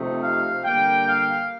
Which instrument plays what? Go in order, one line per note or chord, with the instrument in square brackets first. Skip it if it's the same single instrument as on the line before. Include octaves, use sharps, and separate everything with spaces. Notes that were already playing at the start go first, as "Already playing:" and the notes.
Already playing: [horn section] C3 F3 A3 D#4
F5
D3 G3 A#3 G5
F5